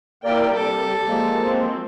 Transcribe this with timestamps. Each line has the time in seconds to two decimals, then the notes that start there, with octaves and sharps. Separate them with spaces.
0.24 A#3 E4 G4 A#4 D5 G5
0.55 C3 G3 A4
1.07 F3 G#3 A#3
1.43 F#3 C4